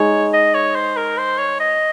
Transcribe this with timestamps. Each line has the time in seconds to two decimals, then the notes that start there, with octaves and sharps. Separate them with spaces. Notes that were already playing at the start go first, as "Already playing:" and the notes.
Already playing: G#3 D#4 G#4 C#5
0.33 D#5
0.54 C#5
0.75 C5
0.97 A#4
1.18 C5
1.39 C#5
1.60 D#5